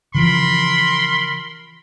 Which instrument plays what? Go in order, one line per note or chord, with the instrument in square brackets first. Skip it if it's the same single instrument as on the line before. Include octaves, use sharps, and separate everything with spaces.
[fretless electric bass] C#3 E3 F3 [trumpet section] A#4 B5 C6